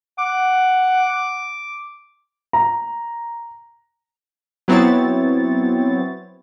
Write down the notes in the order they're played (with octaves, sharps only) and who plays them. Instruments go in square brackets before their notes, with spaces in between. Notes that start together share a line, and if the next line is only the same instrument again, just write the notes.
[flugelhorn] F#5 [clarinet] D6
[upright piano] A#5
[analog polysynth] F#3 B3 C4 E4 C#5 A6